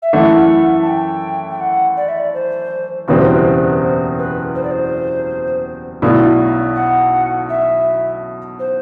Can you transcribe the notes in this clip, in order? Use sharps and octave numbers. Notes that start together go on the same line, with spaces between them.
E5
F#2 E3 A3 E4 F#5
A5
G5
G5
F#5
D5
E5
D5
C5
F#1 E2 B2 G3 C4 B4
C5
B4
C5
B4
C5
B4
C5
D5
C5
B1 B2 A3 E4 D5
F#5
E5
C5